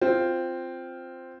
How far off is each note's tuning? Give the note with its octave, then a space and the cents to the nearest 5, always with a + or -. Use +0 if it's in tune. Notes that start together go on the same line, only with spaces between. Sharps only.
C4 +0 F4 +0